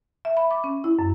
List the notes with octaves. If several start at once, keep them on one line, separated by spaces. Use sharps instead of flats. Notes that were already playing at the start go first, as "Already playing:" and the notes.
E5
B5
D6
C#4
E4
F#2